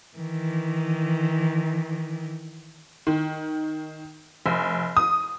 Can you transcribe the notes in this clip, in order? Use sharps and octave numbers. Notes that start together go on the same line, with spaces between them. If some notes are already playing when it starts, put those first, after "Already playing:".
D#3 E3
D#3
F1
D#6